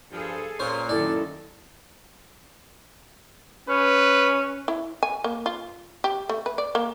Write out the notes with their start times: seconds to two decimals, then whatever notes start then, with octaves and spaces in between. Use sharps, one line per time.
0.11 G2 F3 G#4 A4
0.59 A#2 C#4 C5
0.89 F#2 D#3 E4 A4 D5
3.69 C#4 B4
4.68 E4
5.03 G#5
5.24 A#3
5.46 F4
6.04 G4
6.29 A3
6.46 B4
6.58 D5
6.75 A#3